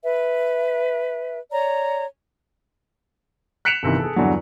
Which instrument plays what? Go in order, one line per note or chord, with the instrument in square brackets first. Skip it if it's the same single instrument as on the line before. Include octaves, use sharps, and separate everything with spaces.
[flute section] B4 E5
C#5 D5 A#5
[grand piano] F#6 B6 C#7 D7 E7 F7
G1 C3 D#3 E3
G#4 A4
E2 G2 D3 F#3